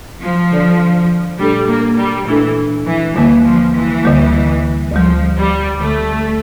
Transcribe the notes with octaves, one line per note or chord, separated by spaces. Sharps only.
F3
D3 G3 D4 A4 D5
A#2 G3 A3 D4 A4
A#3
G3
A#2 E3 A3 D4 A4
E3
D2 D3 E3 G3 A#3
F3
E3
D2 D3 G3 A#3
D2 D3 F3 G3
G3
D2 D3 G3 A3